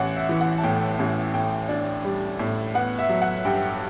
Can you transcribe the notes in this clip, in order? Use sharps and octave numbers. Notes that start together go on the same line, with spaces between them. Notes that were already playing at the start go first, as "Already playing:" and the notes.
Already playing: A1 F#5
E5
E3
F#5
A5
A2 G5
A1
A2 G5
D4
G3
A2
B3 F#5
E5
F#3
F#5
G2 G5